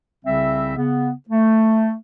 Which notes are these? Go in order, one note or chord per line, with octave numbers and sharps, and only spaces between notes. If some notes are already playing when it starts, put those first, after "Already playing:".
C2 C#3 G3 C4 E5
C#3 B3
A3